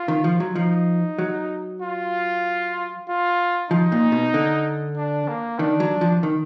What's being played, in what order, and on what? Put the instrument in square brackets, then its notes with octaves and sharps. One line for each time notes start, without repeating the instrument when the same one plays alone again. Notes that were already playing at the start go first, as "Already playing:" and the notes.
Already playing: [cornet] F4
[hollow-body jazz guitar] D#3
F3
F#3
[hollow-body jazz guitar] F3 [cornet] D#4
[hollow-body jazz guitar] F#3
[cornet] F4
F4
[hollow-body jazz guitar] F3 [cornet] D#4
[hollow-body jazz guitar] A#2
B2
D3
[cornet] D4
A#3
[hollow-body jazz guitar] D#3 [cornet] D4
[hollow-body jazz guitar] F#3
F3
D#3